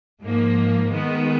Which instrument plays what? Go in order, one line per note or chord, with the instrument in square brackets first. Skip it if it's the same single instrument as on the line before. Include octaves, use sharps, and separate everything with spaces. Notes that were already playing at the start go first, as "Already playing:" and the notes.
[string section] G#2 F3 A#3
D#3 G#3 B3